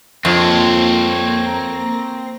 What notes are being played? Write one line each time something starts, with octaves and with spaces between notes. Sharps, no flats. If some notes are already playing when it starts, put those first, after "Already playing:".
F2 A#3 C4 F4 C#5 A#6
A#5